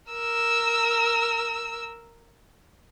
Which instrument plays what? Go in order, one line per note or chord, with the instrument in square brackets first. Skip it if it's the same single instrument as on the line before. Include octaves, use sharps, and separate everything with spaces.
[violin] A#4 E6